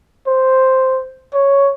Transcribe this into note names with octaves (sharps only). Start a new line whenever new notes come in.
C5
C#5